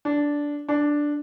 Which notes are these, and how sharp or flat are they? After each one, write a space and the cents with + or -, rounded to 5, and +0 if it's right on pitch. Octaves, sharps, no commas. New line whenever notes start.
D4 -10
D4 +0